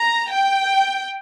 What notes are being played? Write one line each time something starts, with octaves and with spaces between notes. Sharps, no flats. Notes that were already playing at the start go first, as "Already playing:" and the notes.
Already playing: A#5
G5